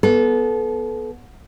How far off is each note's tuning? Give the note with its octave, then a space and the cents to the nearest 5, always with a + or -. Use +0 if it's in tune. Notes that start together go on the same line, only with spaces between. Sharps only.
B3 -15 A4 -30